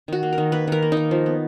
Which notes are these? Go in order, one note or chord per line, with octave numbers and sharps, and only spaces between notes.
D#3 F#4
A#3
A#4
D#3
A#3 B4
D#3 A#4
A#3
D#4
D#3
F3
B3